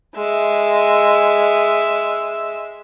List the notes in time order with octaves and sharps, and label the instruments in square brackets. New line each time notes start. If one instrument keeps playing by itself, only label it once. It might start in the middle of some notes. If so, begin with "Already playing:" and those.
[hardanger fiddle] G#3 E5